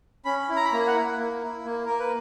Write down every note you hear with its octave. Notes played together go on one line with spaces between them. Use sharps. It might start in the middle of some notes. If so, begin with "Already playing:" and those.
C#4 B5
E4
A#5
B5
A#3 A#5
F#5
E4
A#3
E4
A#3
A#3 A#4
B4